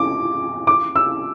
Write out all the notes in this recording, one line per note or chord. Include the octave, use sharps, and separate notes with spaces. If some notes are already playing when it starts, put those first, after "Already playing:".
Already playing: D6
D6
E6